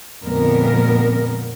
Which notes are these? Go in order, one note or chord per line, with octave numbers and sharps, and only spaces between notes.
F2 A#2 D3 G#3 B3 A#4